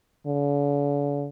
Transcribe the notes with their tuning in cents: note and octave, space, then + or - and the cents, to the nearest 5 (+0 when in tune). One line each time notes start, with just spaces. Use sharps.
D3 -45